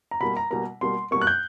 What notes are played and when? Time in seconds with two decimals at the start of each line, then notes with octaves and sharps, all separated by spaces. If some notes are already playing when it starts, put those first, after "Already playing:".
0.11 A#5
0.20 B2 G3 A#3 B5
0.37 A#5
0.50 B2 G3 A#3 A#5
0.81 B2 G3 A#3 C6
1.11 B2 G3 A#3 C#6
1.21 F#6
1.27 G6